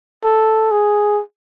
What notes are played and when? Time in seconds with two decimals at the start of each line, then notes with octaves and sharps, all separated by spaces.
0.24 A4
0.71 G#4